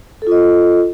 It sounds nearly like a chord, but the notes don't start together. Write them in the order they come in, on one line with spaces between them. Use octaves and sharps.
A4 F4 D#5